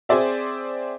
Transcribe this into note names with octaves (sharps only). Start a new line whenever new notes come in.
C4 G#4 C5 D5 E5